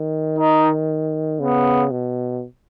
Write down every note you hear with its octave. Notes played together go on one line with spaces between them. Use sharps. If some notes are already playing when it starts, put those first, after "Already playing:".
Already playing: D#3
D#4
C#3 B3
B2